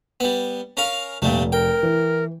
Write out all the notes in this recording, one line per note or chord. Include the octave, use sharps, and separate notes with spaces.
G3 B3
C#4 A#4 F5
F1 A#2 G3 A3
A#4 G5
E3